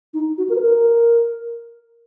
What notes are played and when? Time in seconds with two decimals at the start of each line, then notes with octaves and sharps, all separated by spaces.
0.14 D#4
0.38 F#4
0.49 A#4
0.55 B4
0.61 A#4